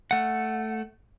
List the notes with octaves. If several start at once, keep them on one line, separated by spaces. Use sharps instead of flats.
A3 F#5